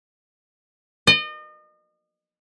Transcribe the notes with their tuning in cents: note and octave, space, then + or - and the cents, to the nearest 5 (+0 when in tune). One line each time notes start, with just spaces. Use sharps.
D#5 -35